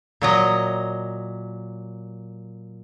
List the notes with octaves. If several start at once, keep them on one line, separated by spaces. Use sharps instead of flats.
A#2 F#3 D#5